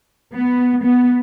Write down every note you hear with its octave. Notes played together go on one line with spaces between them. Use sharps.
B3
B3